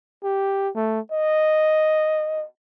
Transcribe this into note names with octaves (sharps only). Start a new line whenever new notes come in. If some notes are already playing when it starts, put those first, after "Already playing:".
G4
A3
D#5